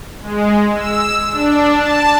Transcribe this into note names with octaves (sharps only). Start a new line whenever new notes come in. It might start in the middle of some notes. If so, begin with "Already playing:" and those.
G#3
E6
D4
A5